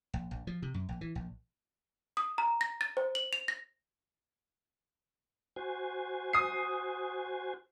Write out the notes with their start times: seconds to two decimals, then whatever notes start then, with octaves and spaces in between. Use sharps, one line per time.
0.14 A#1
0.31 A#1
0.47 F3
0.62 C3
0.74 F#2
0.89 A#1
1.01 E3
1.15 A#1
2.17 D#6
2.38 A#5
2.61 A#6
2.81 A6
2.97 C5
3.15 F#7
3.33 F7
3.48 A#6
5.56 F#4 C5 G#5
6.33 D#6 C7